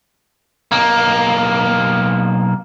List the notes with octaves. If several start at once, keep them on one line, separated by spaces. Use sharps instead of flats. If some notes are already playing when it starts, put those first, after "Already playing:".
B1 A#3